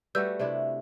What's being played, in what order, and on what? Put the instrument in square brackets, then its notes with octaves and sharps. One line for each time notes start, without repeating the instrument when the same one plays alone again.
[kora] G3 A3 F#4 [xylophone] B4 E6 G6
[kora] C3 D4 E4 [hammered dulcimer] E5